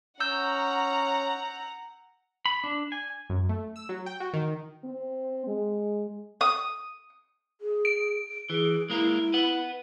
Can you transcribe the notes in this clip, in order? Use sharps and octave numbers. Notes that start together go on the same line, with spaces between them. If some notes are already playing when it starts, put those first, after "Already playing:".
C#4 F#5 A#5 E6 G6
B5
D4
G#5
F#2
A3
E6
F#3
G5
F#4
D#3
C4
G#3
D#6
G#4
D7
E3 G#4
G#3 A#3 E4 A#4
B4 F#5